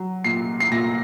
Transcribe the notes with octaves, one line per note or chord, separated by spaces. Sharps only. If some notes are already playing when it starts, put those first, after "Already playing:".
Already playing: F#3
A#2 C7
C7
A#2 A#6